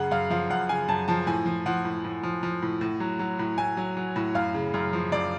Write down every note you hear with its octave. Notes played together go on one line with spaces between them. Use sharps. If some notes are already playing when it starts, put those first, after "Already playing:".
Already playing: F#2 C#3 F#5
F#2 F5
F3 F5
F#2 F#5
C#3 G#5
F#2 A5
F3 A5
A2 G#5
F3
F3 F#5
A2
A2
F3
F3
A2
A2
F#3
F#3
A2
A2 G#5
F#3
F#3
A2
F#2 F5
C#3
F#2
F3
F#2 D5